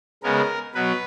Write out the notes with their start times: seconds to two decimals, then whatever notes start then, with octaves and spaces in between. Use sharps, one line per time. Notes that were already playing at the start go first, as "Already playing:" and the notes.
0.23 C#3 G#3 B3 A#4
0.74 B2 F#3 B4